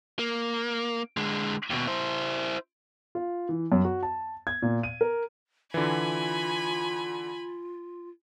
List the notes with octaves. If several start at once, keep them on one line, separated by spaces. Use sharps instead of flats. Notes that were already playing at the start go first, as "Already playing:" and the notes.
A#3
D3 G#3
D#2 B2
E4 C5
F4
E3
F#2
F#4
A5
G#6
A#2
D#7
A#4
D3 E3 F4 G#5 B5